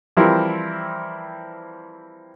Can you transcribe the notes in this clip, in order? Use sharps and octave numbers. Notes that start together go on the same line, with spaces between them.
E3 F3 G3 C4 E4 A#4